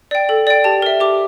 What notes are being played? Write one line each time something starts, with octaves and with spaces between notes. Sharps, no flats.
D5 G5
A4
D5 G5
G4 A5
A#4 E5
G4 D6